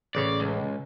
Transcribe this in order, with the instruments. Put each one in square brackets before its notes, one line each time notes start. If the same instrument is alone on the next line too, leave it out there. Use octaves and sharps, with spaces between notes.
[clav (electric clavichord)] A1 C#3 C#5 [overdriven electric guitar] D5
[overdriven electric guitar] C#2